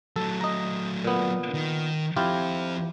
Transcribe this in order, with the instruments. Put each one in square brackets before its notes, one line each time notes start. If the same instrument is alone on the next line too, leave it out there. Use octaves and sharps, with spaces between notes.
[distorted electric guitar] F#3 A3 [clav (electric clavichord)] A4
[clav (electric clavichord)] D#5 A#5
A#2 B3
[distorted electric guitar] D#3
[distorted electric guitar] F3 C4 [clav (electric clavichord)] E4 F4 G4